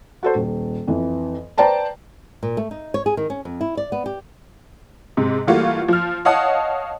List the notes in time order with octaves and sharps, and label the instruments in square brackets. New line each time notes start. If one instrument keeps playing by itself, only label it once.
[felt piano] F#4 A4 C5
D#1
F2 E3
B4 C5 D5 G5 A5 A#5
[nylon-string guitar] A#2
A3
D#4
C#5
G#4
D#3
C#4
F2
E4
D5
B3
G4
[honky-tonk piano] G#2 C3
E3 G3 A3 A#3 F4 F#4
F3 F6
C#5 D#5 F5 F#5 A5 D#6